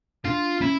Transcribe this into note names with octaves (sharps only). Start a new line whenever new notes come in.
D4 F4
C#4 E4